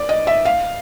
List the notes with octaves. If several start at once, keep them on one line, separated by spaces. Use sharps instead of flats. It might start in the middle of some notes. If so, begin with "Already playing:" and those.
Already playing: D5
D#5
E5
F5